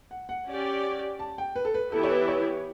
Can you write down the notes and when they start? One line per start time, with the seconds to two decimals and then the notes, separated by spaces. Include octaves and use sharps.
0.11 F#5
0.29 F#5
0.47 C#4 G4 D5
1.19 A5
1.38 G5
1.55 B4
1.65 A4
1.74 B4
1.92 E3 B3 E4 G4 A4
2.03 C#5
2.10 B4
2.28 C#5